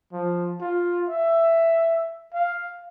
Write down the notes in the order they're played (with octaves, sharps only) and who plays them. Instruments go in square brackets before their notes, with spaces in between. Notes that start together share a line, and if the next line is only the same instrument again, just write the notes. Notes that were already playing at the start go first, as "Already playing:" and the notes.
[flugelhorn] F3
F4
E5
F5